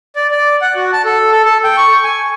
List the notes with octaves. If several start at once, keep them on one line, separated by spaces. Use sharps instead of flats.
D5
D5
F#5
F#4
A5
A4
A4
A4
G5
C#6
G#5